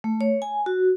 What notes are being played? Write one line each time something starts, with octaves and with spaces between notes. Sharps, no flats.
A3
C#5
G#5
F#4